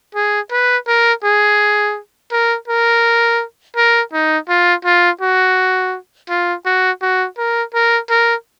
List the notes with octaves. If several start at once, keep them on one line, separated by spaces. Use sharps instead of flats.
G#4
B4
A#4
G#4
A#4
A#4
A#4
D#4
F4
F4
F#4
F4
F#4
F#4
A#4
A#4
A#4